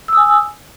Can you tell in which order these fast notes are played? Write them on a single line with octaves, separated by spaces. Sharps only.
E6 D#6 G#5